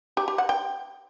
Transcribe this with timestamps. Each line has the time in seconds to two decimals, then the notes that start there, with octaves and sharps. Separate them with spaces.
0.17 G4
0.28 G4
0.38 F#5
0.49 G5